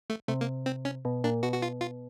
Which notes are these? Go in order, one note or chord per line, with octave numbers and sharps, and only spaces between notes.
A3
C3 A3
A#3
C4
C#4
B2
A#2 D4
B2 F#4
F#4
F4
F4